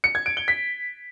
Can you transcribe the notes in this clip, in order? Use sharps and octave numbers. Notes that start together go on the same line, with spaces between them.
C#7
G#6
D7
G7
B6